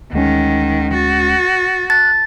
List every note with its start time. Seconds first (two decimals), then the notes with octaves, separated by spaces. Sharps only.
0.13 D2 D#3 G#3 C#4 F#5
0.94 F#4 A6
1.90 A5 F#6 A6